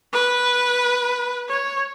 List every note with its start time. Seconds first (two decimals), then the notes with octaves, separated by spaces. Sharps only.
0.13 B4
1.48 C#5